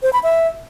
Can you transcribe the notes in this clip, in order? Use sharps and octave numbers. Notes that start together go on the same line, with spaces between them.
C5
B5
E5